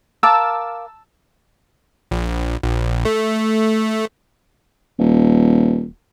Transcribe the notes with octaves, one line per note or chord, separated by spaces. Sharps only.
A#4 F5 A5 D6 E6
A#1
A#1
A3
D#1